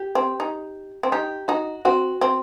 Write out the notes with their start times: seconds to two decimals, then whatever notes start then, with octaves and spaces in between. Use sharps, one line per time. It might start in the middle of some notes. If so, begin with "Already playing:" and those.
Already playing: G4
0.15 C4
0.40 D#4
1.03 C4
1.12 D#4 G4
1.48 D#4 F#4
1.85 C4 F#4
2.21 C4